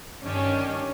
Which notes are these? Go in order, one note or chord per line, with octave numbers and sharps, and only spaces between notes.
G2 D#3 C#4 D4 G4